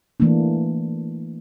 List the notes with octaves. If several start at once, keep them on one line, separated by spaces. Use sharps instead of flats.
E3 A3 A#3 D4